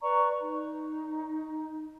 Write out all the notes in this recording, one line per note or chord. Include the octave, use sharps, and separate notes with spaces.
B4 D5 A#5 C#6
D#4